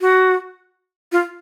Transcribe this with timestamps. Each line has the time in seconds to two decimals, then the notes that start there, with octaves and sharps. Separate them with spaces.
0.01 F#4
1.12 F4